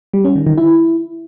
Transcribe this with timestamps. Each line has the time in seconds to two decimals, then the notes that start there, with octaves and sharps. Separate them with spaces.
0.14 G3
0.25 C#4
0.36 D#3
0.47 D#3
0.58 E4